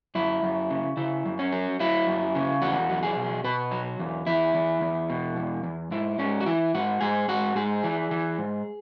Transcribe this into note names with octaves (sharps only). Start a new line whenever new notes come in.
F#2 E4
F#2
C#3
C#3 E4
F#2
C#4
F#3
F#3 E4
F#2
C#3
E2 F#4
F#3
G#4
B2
B2 B4
F#3
E2
E2 E4
E2
E2
B2
E2
E2
G#2 E4
G#2 C#4
F#4
E3 E4
G#2 F#4
G#2 G#4
G#2 F#4
G#2 G#4
E3
E3
G#2